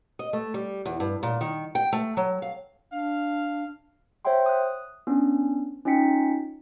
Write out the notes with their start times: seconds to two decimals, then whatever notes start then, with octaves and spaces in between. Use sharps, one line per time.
0.19 D#5
0.33 A3
0.54 G3
0.86 E2
1.00 G2
1.23 A#2
1.41 D#3
1.75 G5
1.93 A3
2.17 F#3
2.42 F5
2.93 D4 F5
4.25 C5 C#5 E5 F#5 G5 C6
4.46 D#6 F#6
5.07 B3 C#4 D4
5.85 C#4 D#4 F4 G5 B6 C#7